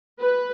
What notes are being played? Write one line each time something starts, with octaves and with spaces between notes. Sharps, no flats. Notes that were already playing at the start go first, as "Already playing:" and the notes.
B4